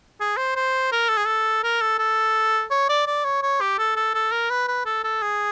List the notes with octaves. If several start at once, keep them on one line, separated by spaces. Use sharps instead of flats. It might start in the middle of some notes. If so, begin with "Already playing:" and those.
G#4
C5
C5
A#4
A4
G#4
A4
A#4
A4
A4
C#5
D5
D5
C#5
C#5
G4
A4
A4
A4
A#4
B4
B4
A4
A4
G#4